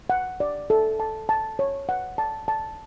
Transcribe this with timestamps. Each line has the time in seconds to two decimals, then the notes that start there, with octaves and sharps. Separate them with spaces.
0.10 F#5
0.40 D5
0.70 A4
1.00 A5
1.29 A5
1.59 C#5
1.89 F#5
2.18 A5
2.48 A5